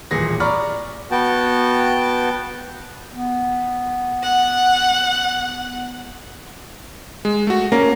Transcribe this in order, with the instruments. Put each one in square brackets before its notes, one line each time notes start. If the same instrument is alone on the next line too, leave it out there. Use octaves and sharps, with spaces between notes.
[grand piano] D#1 A1 A#2 G#4 A#6
D5 A#5 B5 C#6 F6
[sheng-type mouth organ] B3 F#4 G5 A5
[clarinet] B3
[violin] F#5
[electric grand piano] G#3
A3 F#4
[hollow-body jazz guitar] A#3 [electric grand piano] C#4